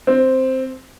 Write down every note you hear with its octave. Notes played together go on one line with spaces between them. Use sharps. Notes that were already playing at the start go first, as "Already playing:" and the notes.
C4